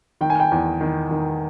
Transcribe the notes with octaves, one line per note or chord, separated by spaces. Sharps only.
D#3 G5
G#5
G5
E2
D#3
D#3